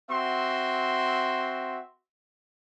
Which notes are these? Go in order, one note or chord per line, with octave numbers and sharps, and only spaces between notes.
C4 F#4 E5 C6